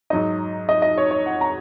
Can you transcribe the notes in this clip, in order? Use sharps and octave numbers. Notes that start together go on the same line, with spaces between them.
G#2 F#3 D#4 D#5
D#5
D#5
C#5
C#5
F#5
A#5